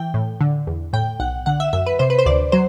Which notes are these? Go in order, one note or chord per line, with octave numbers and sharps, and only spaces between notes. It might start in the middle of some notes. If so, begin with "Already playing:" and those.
Already playing: E3 G5
A2
D3
E2
A2 G5
B1 F#5
D3 F#5
E5
F#2 E5
B4
C3 C5
B4
C5
D2 D5
F#3 C5